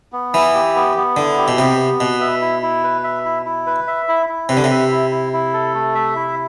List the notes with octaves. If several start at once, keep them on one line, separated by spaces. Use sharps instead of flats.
B3
E3 E4
G4
B3
B3
D3 E4
G4
B2
C3 B3
B3
B2 B4
E5
E4
E4
B4
E5
E4
E4
B4
E5
E4
E4
C3 B4
D3
C3
E5
E4
E4
E4
A4
A3
E5
E4